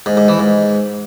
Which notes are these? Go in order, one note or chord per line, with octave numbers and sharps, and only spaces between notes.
G#2
G#2
E3
G#2